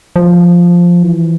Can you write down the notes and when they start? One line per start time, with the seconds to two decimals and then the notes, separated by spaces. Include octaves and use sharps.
0.16 F3
1.03 E3